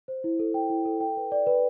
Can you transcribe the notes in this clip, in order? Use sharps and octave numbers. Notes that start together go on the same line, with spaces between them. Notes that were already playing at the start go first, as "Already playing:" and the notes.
C5
E4
A4
G5
E4
A4
G5
B4
D5
B4